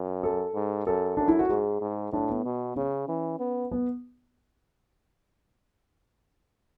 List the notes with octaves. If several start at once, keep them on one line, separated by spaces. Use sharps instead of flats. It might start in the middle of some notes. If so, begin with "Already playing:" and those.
Already playing: F#2
A4
G#2
F#2 A4
F#2 D4
E4
F#4
G#2 G#4
G#2
A2 D4
B3
B2
C#3 C#4
E3
B3
B3